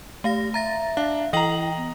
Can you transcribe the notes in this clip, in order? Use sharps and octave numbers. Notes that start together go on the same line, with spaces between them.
A3 G4 F5 A#6
E5 A#5 A6 A#6
D4 F5
E3 E4 D#5 G5 A#5 F#7
B3